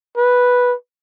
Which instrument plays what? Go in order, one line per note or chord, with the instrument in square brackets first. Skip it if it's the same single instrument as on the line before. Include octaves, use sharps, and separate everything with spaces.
[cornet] B4